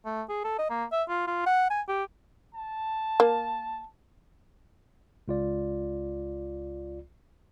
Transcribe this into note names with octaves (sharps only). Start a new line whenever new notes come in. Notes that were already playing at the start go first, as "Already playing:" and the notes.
A3
G#4
A4
D#5
A#3
E5
F4
F4
F#5
G#5
G4
A5
A#3
C#2 F4 D5